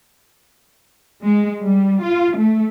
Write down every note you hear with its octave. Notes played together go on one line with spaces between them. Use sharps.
G#3
G3
F4
A3